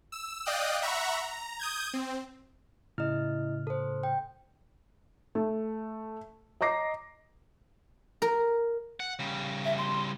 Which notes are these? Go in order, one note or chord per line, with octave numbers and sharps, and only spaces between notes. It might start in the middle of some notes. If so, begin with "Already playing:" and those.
E6
D5 D#5 F5 G5 D#6 F#6
E5 F#5 A#5 B5 C#6
A#5
D#6 G6 G#6
C4
A2 C#3 E4 D#5 F6
A4 C5
G5
A3
D#5 A#5 D6 A#6 C7
A#4
F#5
C#3 G3
E5
C6